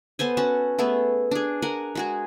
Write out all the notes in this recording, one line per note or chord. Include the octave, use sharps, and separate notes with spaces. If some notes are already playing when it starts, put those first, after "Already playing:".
B3 A4 C5 G#5
C#4 F#4 F#5 A5
A3 B3 G#4 A4
D4 G#4
A#4 F#5 G#5
G#3 F#4 G#4